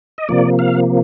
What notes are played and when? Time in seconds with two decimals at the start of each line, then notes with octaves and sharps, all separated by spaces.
0.18 D#5
0.29 C3 F3 A#3 D5
0.59 F5